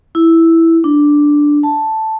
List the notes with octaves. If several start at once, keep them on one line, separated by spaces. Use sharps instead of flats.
E4
D4
A5